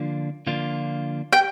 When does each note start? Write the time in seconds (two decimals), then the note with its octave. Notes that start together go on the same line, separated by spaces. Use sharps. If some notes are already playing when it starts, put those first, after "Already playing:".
Already playing: D3 F3 A#3 D4 F4
0.47 D3 F3 A#3 D4 F4
1.33 G5